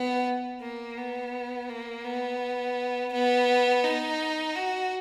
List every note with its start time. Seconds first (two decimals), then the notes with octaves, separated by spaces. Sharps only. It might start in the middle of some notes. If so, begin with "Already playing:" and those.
Already playing: B3
0.61 A#3
0.97 B3
1.69 A#3
2.05 B3
3.13 B3
3.84 D#4
4.56 F#4